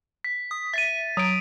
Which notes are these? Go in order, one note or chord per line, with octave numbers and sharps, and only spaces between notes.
B6
D#6
E5 A6 B6 D#7
F#3 D#6 D7